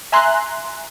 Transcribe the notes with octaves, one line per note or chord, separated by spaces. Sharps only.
E5 G#5 A#5 C6 F#6